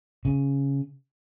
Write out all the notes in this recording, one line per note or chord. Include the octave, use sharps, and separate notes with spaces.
C#3